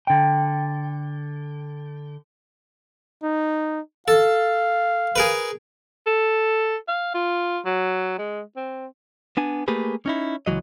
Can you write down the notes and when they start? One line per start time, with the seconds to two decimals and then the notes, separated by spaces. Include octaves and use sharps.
0.07 D3 G5
3.23 D#4
4.08 A4 F5
5.16 G#4 A#4 B4
6.07 A4
6.88 F5
7.14 F4
7.65 F#3
8.18 G#3
8.56 C4
9.37 B3 D4 G#5
9.68 A3 A#3 G4 G#4 B4
10.06 C#4 D#4 E4
10.47 C#2 A2 E3 F#3 D#5